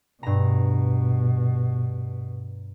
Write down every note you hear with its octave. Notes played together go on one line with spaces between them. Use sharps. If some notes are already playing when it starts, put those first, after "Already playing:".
G2 B2 A#5